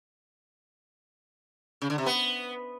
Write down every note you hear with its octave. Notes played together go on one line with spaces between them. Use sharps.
C#3
D3
C3
B3